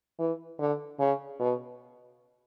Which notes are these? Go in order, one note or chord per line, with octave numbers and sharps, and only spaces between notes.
E3
D3
C#3
B2